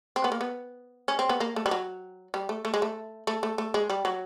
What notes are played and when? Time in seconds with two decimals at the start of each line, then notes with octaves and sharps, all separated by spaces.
0.16 C4
0.24 B3
0.32 A#3
0.41 B3
1.08 C#4
1.19 C4
1.29 B3
1.40 A#3
1.56 A3
1.66 G3
1.71 F#3
2.34 G3
2.49 A3
2.65 A3
2.74 G#3
2.82 A3
3.27 A3
3.43 A3
3.58 A3
3.74 G#3
3.90 G3
4.05 F#3